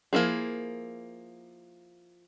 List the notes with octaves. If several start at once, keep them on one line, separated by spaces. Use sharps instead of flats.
F3 A#3 D#4 E4 G#4